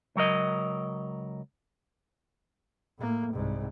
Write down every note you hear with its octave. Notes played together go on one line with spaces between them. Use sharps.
C#2 F#3 A#4 D#5
A2 A#3
C2 G#2